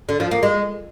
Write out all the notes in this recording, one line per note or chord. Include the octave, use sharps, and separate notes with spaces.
D3
F3
A#3
G#3